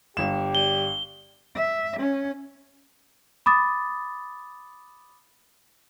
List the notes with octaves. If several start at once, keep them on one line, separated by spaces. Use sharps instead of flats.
G1 G4 E7
G3 G7
E5
C#4
B5 D6 D#6 A6